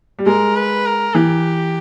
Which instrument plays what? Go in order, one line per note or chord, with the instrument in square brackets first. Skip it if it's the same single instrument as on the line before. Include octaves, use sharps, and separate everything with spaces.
[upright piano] G3
[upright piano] G#3 [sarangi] A#4
[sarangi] B4
A#4
[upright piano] E3 [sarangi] G4